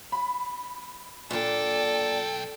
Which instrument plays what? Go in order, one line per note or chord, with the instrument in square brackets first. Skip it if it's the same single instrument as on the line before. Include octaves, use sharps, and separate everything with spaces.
[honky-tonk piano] B5
[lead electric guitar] B1 G5 [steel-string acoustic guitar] A#2 D4 [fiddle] A4